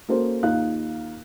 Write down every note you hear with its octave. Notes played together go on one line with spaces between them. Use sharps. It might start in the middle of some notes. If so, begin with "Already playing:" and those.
A#3 C#4 F#4 A4 A#4 C5
D#2 D#4 F4 F5 F#6